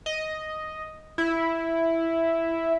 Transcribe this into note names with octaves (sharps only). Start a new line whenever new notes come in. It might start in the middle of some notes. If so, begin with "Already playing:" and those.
D#5
E4